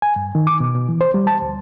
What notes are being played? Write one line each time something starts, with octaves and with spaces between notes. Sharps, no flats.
G#5
G2
D#3
D6
B2
B2
E3
C5
G3
A5
D2